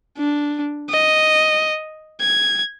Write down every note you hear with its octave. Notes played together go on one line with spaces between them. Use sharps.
D4
D#5
G#6